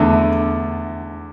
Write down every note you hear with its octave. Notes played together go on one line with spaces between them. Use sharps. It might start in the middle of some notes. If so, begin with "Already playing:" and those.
Already playing: E2 D3 A3